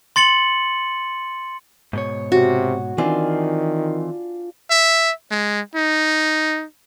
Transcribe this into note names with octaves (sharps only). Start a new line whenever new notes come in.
C6 A6 C#7 F#7
G#2 B2 C#5
C3 F#4
D#3 E3 C4 D4 F4 G#5
E5
G#3
D#4